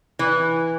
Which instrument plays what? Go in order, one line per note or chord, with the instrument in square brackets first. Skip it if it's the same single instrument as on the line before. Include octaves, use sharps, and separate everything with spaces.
[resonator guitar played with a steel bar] E3